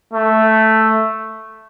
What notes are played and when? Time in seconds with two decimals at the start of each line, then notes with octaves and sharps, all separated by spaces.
0.13 A3